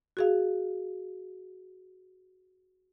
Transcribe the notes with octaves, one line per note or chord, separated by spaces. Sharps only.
F#4 G#4 F5